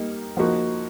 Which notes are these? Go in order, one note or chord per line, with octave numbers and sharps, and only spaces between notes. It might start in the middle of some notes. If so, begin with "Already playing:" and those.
Already playing: G3 A#3 D#4
F3 A#3 D#4 F#4